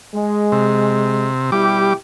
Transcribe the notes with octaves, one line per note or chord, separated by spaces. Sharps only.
G#3
C3
B2 G3 E4 G4 D6